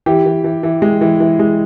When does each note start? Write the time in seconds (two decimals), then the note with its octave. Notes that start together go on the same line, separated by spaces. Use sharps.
0.06 E3 G4
0.26 E3
0.44 E3
0.63 E3
0.82 G#3
1.01 E3
1.20 E3
1.39 G#3